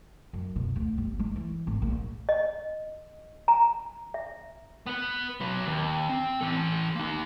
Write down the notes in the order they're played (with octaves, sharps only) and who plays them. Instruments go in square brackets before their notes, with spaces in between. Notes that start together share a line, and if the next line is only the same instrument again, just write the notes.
[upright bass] F#2
B2
D2
G1
G#3
E3
G#1
A#1
[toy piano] D#5
A#5
E5
[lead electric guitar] B3 B4
F#3 B4
D#2
C4
E3 A4
A#3 D#4